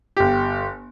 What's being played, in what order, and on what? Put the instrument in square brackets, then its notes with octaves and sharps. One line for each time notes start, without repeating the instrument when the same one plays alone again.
[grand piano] G1 G4